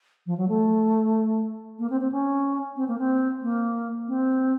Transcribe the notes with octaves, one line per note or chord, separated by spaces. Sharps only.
F3
F#3
A3
A#3
C4
C4
C#4
C4
A#3
C4
A#3
C4